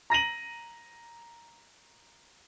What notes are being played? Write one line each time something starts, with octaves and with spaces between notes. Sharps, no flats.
A#5 A#6 D#7 F#7